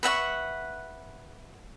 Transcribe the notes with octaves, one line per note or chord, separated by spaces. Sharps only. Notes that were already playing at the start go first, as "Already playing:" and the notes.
B4 E5 F#5 C#6